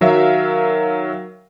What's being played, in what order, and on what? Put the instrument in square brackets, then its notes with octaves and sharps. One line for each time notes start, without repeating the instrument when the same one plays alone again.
[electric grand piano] D#3 F#3 A#4 E5 F5